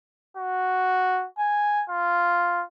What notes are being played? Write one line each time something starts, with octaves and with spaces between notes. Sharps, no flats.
F#4
G#5
F4